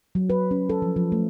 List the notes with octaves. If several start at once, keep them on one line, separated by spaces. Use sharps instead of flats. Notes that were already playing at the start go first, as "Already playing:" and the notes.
F#3
B4
C#4
A4
F3
F3
A3